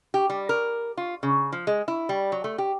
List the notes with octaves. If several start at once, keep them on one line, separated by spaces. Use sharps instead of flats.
G4
G3
A#4
F4
C#3
F3
G#3
E4
G3
F#3
A3
G4